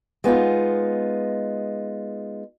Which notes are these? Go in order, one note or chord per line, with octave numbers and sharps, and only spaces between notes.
G#3 B3 D#4 F4